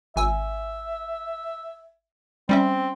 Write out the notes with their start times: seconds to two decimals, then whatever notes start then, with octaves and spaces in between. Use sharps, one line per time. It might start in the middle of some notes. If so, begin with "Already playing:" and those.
0.16 G#1 E5 G#5 E6
2.49 G3 C4 C#4 E5